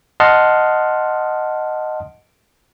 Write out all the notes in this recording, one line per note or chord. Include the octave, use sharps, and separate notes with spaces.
D#5 F#5 A5 C6 D#6 F6